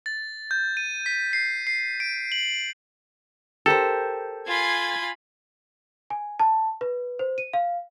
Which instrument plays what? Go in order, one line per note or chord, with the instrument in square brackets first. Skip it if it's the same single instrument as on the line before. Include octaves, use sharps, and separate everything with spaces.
[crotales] A6
G6
D#7
B6
C7
C7
D7
F#7
[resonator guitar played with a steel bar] G4 A#4 C5 [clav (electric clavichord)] A4
[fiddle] F4 B5 [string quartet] G#5 C6 G#6
[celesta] G#5
A5
B4
C5
D#7
F5